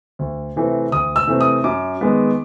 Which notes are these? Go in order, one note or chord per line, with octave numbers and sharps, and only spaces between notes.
D2
C3 E3 A3 C4
D2 D#6
E6
C3 E3 A3 C4
D#6
F#2 D6
D#3 G#3 B3